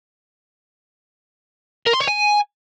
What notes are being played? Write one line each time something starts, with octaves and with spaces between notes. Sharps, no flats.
A#4
C6
C#5
G#5